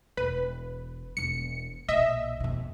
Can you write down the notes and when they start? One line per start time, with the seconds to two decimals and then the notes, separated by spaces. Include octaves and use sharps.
0.17 E1 B4
1.17 E1 B3 C#7
1.88 B1 A#2 D#5 E5
2.40 F2 B2